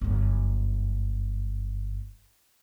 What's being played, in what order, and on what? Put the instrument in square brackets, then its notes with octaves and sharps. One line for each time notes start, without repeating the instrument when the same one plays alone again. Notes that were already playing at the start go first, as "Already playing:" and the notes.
[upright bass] G1 F#2